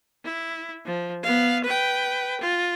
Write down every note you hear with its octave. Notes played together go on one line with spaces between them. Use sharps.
E4
F3
B3 F5
B4 G5
F4